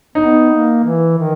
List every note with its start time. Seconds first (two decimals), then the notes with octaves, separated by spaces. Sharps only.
0.15 B3 D#4
0.50 A#3
0.84 E3
1.18 D#3